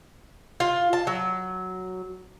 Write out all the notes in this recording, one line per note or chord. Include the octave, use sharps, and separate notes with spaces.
F4
A5
F#3